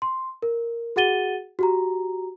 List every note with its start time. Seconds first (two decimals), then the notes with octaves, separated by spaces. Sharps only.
0.02 C6
0.42 A#4
0.96 F#4 G#4 F#5 A6 D#7 G7
1.59 F#4 G4 A#5